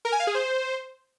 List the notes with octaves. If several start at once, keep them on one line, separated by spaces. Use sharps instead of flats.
A#4
G#5
F5
G#4
C5